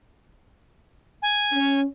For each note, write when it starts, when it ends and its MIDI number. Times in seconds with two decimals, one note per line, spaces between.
1.22 1.80 80
1.52 1.84 61